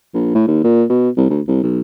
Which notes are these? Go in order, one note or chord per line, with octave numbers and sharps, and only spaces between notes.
A#1
A2
D#2
A#2
B2
C2
D2
C2
B1